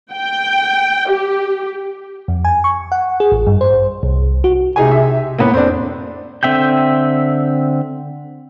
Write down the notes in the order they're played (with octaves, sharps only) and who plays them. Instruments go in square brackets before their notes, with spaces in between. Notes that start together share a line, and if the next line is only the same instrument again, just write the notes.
[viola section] G5
G4
[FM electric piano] F2
G#5
C#6
F#5
G#4
A1
G2
C5
C2
F#4
[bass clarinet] C3 [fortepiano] D#4 G#4 G#5
[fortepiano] E5
[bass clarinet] A2 [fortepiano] A#3 B3
[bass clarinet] F2 [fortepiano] C4 D4
[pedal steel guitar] D3 C4 E5 G5 G6